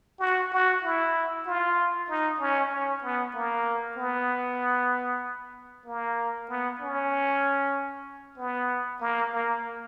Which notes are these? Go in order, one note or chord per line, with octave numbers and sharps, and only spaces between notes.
F#4
F#4
E4
F4
D#4
C#4
C#4
B3
A#3
B3
A#3
B3
C#4
B3
A#3
A#3